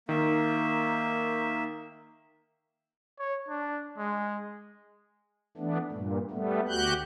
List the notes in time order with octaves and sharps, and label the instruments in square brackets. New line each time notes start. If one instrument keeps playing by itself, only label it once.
[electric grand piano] D#3 [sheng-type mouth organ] A#3 E5
[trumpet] C#5
D4
G#3
[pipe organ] E3 A3 B3 D4
G2 A#2
G3 A3 B3
D2 F#4 G4 F#6 G6